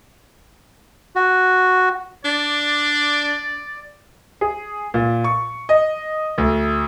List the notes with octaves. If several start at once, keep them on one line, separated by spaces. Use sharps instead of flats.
F#4
D4 D5
G#4
A#2
C#6
D#5
D2